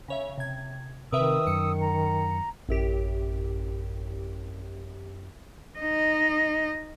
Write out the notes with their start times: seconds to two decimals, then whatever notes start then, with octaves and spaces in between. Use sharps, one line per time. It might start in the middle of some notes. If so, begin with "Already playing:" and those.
0.08 C#3 C#5 E5
0.38 C3 G#6
1.12 C3 D#3 A#4 B4 E5 D#6 E6
1.47 F#2 C#7
1.82 A#5
2.69 A1 F#2 G4
5.79 D#4 D#5